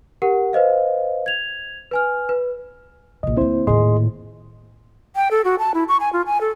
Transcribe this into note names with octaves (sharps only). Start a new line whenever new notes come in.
G4 A#4 F#5
B4 C5 D#5 F5
G#6 F7
B4 G#5 F6
B4
A#1 C3 D#5
D2 A#3 C4 E4 C5
D#1 A2 D#3 G#4 D#5 C6
G5
A4
F#4
A5
E4
C#6
G#5
F4
G#5
A4